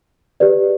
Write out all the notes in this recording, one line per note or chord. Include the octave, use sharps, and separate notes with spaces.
G4 B4 D5